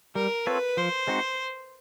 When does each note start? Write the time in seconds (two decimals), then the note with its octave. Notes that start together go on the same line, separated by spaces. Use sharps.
0.15 G3 A#4
0.46 C4 F4 A4 B4 C#5
0.77 F3 C5
1.07 G#3 C4 D#4 F#4